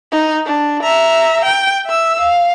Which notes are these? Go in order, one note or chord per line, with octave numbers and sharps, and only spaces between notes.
D#4
D4
E5 A#5
G5
E5 E6
F5